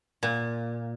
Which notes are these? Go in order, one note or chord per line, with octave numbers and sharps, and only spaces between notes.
A#2